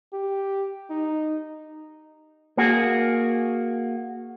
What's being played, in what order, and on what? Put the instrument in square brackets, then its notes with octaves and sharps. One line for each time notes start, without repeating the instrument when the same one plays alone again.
[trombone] G4
D#4
[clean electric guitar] A#3 F#4 G#4